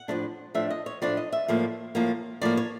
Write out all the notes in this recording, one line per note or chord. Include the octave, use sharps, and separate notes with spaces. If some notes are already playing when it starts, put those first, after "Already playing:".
Already playing: F#5
A2 F3 A3 D4
A2 F3 A3 D4 E5
D#5
C#5
A2 F3 A3 D4 D5
D#5
E5
A2 F3 A#3
A2 F3 A#3
A2 F3 A#3 D5
C#5